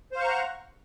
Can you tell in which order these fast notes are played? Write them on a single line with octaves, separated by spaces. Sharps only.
C5 F5 C#6 A#5 F#5